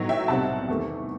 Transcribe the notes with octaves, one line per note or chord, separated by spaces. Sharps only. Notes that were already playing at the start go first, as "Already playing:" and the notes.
Already playing: A2 F#3 B3 D#4
E5 G5
C2 B2 G3 C4 D#4 F#5 A5
E2 D#3 A3